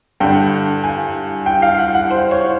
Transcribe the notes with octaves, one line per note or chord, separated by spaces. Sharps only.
G2 D3 G5
G#5
G5
F5
F#5
F#5
C5
C#5